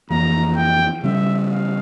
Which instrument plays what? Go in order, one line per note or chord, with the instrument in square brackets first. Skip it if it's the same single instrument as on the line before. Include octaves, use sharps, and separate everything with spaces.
[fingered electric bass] F2 E3 A#3 [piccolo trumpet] A#5
[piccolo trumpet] G5
[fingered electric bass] C#3 G3 C#4 [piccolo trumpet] E5
[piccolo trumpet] F5